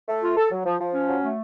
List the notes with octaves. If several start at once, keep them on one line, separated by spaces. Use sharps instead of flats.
A3
F4
A4
F#3
F3
F3
C#4
F#3
A3